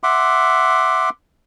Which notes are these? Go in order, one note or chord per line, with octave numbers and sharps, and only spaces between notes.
E5 F#5 C6 D6